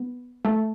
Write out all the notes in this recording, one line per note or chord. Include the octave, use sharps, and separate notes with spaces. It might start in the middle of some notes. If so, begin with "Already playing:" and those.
Already playing: B3
A3